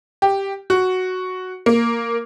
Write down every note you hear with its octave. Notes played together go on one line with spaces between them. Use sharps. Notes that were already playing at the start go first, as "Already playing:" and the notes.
G4
F#4
A#3